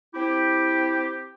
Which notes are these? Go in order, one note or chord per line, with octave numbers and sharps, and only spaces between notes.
C4 E4 G4